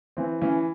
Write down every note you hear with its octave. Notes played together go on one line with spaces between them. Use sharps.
E3 C4
E3 C#4